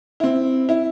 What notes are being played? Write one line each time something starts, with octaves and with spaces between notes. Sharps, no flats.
C4 E4
E4